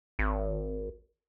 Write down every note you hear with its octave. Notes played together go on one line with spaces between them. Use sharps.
G#1